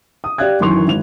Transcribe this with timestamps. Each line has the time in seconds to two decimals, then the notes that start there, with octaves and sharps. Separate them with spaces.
0.24 D#6
0.38 G4 D5 F5 F#6 G#6
0.60 F#2 D#3 E3 C6 C#6 F7
0.87 G#1 F7